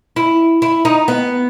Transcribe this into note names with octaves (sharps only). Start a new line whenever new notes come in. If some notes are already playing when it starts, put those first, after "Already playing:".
E4
E4
D#4
B3